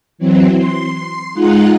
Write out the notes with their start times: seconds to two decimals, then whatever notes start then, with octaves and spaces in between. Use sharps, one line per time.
0.18 E3 F#3 C4
0.54 C6
1.33 G#3 D#4 F4 F#5 F#6